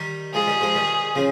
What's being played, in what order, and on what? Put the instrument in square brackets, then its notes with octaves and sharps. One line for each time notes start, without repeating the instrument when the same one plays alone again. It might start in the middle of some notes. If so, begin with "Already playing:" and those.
Already playing: [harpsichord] D#3 G3
[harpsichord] F3 G#3 [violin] G#4
[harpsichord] D#3 G3
F3 G#3
D#3 G3
C#3 F3